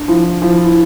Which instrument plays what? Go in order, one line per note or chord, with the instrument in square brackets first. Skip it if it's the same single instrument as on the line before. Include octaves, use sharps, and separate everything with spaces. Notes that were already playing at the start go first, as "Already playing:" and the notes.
Already playing: [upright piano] D4
[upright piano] F3 [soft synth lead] E4
[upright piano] F3 [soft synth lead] E4
[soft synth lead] E4